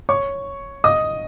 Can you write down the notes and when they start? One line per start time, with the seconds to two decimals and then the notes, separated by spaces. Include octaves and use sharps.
0.09 C#5 C#6
0.84 D#5 D#6